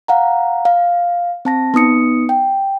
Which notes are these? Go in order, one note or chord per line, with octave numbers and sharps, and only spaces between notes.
F5 F#5 A#5
F5
C4 A5 A#6
B3 D#4 D#6 C#7
G5